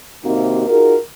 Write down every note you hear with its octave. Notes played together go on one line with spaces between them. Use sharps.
D#2 C3 A#3 C4 D#4 F#4
D#4 F4 F#4 G#4 A#4